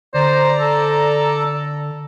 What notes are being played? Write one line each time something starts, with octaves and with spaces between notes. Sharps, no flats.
D3 C5 D5 A#5
A4